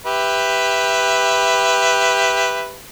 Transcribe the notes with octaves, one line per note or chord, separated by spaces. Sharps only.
G4 B4 E5